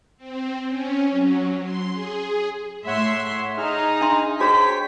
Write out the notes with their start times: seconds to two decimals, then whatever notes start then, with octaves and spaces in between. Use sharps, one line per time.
0.17 C4
0.68 C#4
1.11 F#3
1.63 C6
1.92 G#4
2.87 A2 C#5 E5 F#5 C6
3.58 D#4 G#4 F6
4.01 D4 E5 C6
4.40 F#4 G#4 C5 C#5 G5 A#5 B6